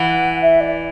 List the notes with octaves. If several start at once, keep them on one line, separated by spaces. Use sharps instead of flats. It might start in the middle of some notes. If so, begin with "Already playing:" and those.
Already playing: E3 F#5
E5
D5